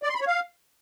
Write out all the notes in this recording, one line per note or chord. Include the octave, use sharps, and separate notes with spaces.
D5
C6
B5
C#5
F5